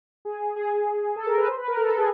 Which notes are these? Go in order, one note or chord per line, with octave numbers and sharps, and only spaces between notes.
G#4
G#4
A4
A#4
B4
C5
B4
A#4
A4
A4
G#4